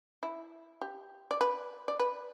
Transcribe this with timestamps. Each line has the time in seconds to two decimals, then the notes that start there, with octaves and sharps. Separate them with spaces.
0.23 E4
0.81 G4
1.31 D5
1.41 B4
1.88 D5
1.99 B4